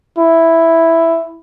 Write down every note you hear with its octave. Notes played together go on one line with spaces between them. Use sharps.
E4